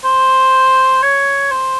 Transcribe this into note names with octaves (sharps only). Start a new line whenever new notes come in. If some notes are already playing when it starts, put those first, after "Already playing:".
C5
C#5
C5